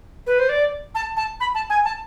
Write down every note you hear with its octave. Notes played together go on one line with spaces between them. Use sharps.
B4
C5
D5
A5
A5
B5
A5
G#5
A5